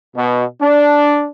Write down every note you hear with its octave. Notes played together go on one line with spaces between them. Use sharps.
B2
D4